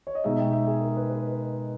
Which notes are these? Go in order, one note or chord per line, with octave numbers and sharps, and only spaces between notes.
C#5
D#5
B2 G#3 D#4 E5
G5
E5
G#4
A#4
B4
B4